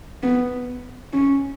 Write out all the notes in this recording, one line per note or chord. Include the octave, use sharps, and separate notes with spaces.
B3
C#4